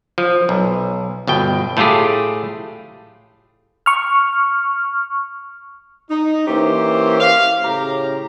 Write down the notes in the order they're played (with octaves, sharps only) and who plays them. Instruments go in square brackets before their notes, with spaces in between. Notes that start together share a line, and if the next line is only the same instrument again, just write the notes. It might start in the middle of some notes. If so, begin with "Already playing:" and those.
[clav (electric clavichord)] F3
B1
G1 B2 G5
A2 A3 F4 G4 G#4
[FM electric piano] C#6 F6
[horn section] D#4
E3 A#3 C#4 G4 C5
F5
A2 C#3 G4 A#5